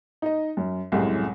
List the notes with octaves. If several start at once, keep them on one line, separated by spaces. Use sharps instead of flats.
D#4 D#5
F#2
C2 F#2 A2 G#3